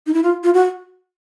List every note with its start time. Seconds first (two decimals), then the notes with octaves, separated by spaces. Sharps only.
0.07 D#4
0.14 E4
0.23 F4
0.43 F4
0.54 F#4